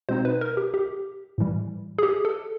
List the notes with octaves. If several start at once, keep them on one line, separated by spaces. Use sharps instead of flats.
B2 G#3 C4 D#4 C5
B4
A#4
G4
G4
A2 E3 G3
G#4
G4
A4